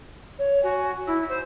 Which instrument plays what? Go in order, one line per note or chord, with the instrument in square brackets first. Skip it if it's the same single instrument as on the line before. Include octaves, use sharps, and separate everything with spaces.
[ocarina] C#5
[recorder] F#4 [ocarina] G#5
[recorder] E4 [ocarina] E6
[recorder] C5